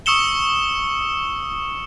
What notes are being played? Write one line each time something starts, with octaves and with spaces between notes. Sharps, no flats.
C#6 D#6 E6 C#7 E7 G7